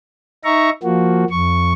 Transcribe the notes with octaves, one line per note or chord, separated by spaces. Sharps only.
D#4 E5 A#5 C#6
F3 A#3 F#4
F2 C#6